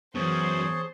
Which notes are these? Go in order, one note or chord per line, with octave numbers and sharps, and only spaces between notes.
F#2 E3 B3 G#4 C5 C#5 A5